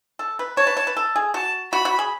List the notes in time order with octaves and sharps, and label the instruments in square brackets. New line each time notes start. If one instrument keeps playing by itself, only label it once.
[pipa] A4
B4
[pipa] C#5 [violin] A5
[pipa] B4
C#5
B4
A4
G#4
[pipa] F#4 [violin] A5
[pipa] F#4 [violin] B5
[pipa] F#4
G#4